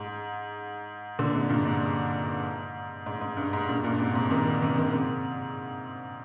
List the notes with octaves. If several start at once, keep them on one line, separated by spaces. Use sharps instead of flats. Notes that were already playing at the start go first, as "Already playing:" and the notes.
Already playing: G#2
A#2 D3
G#2 C3
G2 A#2
G#2
G#2
G#2
G2
G#2
G2 A#2
G2 A#2
G#2 C3
G#2 C3
C3 D#3
C3 D#3
C3 D#3
G#2 C3